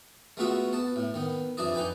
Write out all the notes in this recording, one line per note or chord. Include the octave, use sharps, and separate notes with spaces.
G#3 A3 B3 F4 F#4 E5
B3 A5
A2
D#3 B3
F2 E3 D4 E4 D5 D#5
D#4 B4 G5 G#5